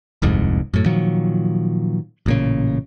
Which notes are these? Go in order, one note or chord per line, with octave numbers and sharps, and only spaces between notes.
D#1 C2 F2 G#2
F#2 A2
A#2 D#3 F3 F#3
A1 A#2 C#3